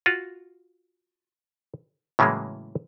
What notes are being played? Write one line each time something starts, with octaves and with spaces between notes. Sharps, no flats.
F4 F#4
A2 C#3 E3 F#3 G#3 A#3